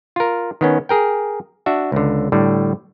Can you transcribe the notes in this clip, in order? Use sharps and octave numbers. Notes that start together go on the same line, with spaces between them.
F4 A#4
D#3 B3 C#4
G#4 A#4 G5
D4 F#4 E5
C#2 D3
A2 D3 G3